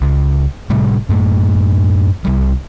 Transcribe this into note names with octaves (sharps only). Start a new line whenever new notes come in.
C#2
A2 C3 G3 A3
F#2 A2 A3
C2 G3